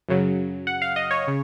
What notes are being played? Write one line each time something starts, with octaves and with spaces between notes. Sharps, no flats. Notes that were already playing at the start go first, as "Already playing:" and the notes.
F#2 C#3 F#3
F#5
F5
D#5
C#5
C#3